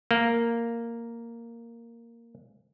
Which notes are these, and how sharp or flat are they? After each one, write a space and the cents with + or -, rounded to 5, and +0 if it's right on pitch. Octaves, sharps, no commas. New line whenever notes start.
A#3 -5